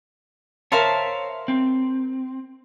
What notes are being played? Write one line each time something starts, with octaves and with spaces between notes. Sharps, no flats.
A#4 C5 C#5 E5 F5 A5
C4